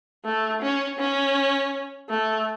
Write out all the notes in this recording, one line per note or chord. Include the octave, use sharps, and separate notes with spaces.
A3
C#4
C#4
A3